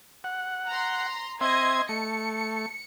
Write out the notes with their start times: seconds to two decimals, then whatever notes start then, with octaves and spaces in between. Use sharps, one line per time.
0.24 F#5
0.68 A#5 C6
1.41 C4 D#5 E5 C6 G#6
1.89 A3 C#7